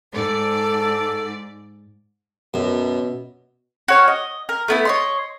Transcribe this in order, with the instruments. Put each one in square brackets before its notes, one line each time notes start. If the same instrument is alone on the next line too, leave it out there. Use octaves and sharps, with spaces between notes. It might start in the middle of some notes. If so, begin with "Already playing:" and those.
[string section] G#2 D5 [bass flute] A4
[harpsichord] F#2 [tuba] B2
[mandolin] F#4 C#5 F6
D#5
A#4
A3 B3 E4
C#5 D#5 C6